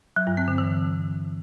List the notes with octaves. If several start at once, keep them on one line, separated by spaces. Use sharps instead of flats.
F#3
G2
C4
D3
E3